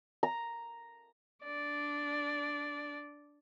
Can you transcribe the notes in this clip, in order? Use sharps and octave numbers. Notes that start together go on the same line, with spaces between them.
A#5
D4 D5